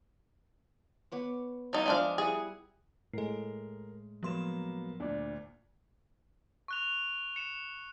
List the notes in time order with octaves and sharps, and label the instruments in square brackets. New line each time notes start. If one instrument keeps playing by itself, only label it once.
[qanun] B3 C#5 D6
[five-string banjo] F#3 D#4 E4 [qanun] D#5 F5
[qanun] F3 E5 [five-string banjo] G#3 D4 F5
[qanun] G3 E4 F#5 [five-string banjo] G#4
[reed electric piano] A2 G#3 [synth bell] A4 C7 [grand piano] A#4
[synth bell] F3 C6 E7 [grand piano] F#3 A#3 B3
[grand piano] D2 A#2 [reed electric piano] D4 D5
[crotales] C#6 F#6 F7
C#7 E7